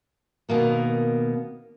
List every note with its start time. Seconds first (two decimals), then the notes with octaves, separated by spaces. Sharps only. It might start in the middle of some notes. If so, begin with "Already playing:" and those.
0.49 B2 D#3 A#3 B3